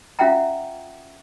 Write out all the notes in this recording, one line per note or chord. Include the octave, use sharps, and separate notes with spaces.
C#4 F4 E5 F#5 G5 A#5